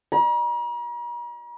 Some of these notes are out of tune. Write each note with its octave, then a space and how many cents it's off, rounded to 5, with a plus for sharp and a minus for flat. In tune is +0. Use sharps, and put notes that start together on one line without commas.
A#5 +45